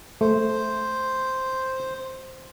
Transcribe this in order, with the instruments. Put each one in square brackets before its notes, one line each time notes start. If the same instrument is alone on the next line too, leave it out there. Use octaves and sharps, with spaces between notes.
[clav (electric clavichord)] A3 [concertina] C5